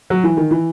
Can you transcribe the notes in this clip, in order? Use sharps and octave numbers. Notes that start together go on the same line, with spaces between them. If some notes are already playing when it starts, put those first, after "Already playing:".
F#3
E3
D#3
E3